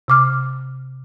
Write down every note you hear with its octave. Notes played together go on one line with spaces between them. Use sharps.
C3 D6 F6